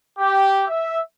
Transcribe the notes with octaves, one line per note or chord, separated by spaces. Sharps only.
G4
E5